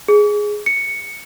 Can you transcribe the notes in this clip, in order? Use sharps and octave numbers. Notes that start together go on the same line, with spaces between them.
G#4
C#7